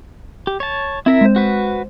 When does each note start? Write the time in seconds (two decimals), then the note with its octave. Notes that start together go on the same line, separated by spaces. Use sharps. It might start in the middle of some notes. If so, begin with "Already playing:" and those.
0.47 G4
0.60 C#5 A5
1.06 C4 E4 A#4 E5
1.21 G#3 C5
1.36 F#4 B4